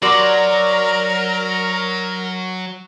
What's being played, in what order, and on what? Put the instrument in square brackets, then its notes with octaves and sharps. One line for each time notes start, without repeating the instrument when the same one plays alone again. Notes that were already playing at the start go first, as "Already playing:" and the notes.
[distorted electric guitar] F#3 [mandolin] F#4 D5 C6 [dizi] A#4